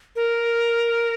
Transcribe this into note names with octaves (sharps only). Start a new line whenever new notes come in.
A#4